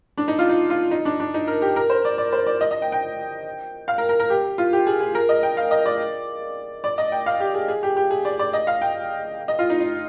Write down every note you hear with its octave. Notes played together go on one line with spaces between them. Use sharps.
D4
D#4
F4
D#4
F4
D#4
D4
D4
D#4
A#4
G4
A#4
C5
D5
D5
C5
D5
D#5
D#5
G5
G5
F5
A#4
A#4
A#4
G4
F4
G4
G#4
G#4
A#4
D#5
G5
F5
D#5
D5
D5
D#5
G5
F5
G4
G#4
G#4
G4
G4
G#4
D5
D5
D#5
F5
G5
D#5
F4
D#4
D#4